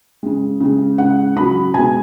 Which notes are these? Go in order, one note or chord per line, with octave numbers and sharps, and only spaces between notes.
C#3 G#3
C#3 G#3
C#3 G#3 F#5
C#3 F#3 B5
B2 G#3 G#5